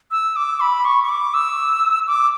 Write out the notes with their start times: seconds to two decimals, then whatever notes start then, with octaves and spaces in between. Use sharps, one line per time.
0.11 E6
0.36 D6
0.60 B5
0.85 C#6
1.03 C#6
1.09 D6
1.34 E6
2.07 D6